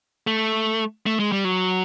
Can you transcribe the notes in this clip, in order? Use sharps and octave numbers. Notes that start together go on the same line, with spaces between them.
A3
A3
G#3
G3
F#3